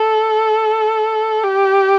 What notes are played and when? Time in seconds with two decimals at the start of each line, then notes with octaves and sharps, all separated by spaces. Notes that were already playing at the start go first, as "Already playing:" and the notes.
Already playing: A4
1.43 G4